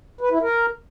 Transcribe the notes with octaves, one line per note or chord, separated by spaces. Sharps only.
B4
E4
A#4